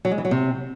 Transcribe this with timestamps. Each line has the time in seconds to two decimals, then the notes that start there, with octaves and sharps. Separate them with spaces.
0.05 F#3
0.11 G#3
0.18 E3
0.25 F#3
0.31 C3